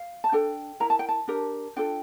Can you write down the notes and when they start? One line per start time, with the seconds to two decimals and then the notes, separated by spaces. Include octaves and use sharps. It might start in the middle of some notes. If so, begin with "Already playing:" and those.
Already playing: F5
0.24 A5
0.32 D4 A4 G5
0.80 E4 A#4 A#5
0.90 A5
0.99 G5
1.09 A5
1.28 D4 G4 A#4
1.76 D4 F4 A4 G5